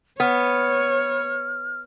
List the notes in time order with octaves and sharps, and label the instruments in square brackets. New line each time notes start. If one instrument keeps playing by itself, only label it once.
[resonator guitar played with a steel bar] B3 [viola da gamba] C#5 [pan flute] F6